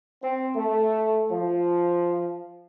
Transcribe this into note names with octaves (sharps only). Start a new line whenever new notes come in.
C4
A3
F3